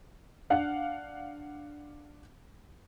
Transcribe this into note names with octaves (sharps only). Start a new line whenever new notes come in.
D4 F5 F#5